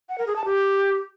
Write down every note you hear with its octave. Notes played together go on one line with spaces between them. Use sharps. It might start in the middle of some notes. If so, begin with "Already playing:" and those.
F#5
A#4
G#4
A5
G4